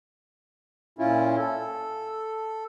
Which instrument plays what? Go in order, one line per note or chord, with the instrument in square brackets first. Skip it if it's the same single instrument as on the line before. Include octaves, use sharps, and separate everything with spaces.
[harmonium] A#2 C#4 E4 F4
A4